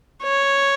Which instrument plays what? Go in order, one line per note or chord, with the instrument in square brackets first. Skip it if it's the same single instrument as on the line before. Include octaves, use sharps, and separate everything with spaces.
[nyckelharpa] C#5